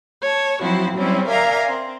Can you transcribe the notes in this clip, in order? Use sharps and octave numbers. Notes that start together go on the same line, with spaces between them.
C#5 A5
F3 F#3 C4 E4 F#4
F#3 G3 C4 C#4 E4
A#4 D5 E5 F5 G#5 A#5
C4